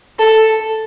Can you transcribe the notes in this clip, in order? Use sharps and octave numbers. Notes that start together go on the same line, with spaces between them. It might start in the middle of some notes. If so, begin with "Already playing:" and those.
A4